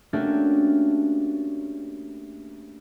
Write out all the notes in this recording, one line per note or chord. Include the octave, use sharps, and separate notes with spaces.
A3 A#3 C#4 D4 F#4 G4